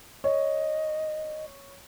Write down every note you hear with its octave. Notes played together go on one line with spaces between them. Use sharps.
C#5 D#5